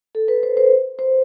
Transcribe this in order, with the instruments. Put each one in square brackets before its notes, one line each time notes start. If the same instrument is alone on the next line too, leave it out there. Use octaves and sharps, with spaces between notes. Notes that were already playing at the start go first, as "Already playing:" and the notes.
[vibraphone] A4
B4
C5
C5
C5